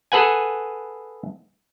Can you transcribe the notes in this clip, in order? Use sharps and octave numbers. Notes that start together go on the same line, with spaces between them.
G#4 A4 B4 F#5 G#5